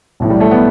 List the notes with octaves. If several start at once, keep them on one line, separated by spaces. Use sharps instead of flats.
B1 A2 E3
G3
A3
B3